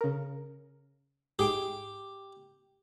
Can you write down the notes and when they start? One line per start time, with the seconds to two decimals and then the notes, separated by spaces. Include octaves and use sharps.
0.01 C#3 A#4
1.39 G#2 G4 G#4 D7